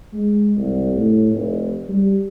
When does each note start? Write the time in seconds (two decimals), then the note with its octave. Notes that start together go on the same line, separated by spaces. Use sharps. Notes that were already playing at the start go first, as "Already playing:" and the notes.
0.13 G#3
0.57 C2
0.96 A2
1.33 F1
1.88 G3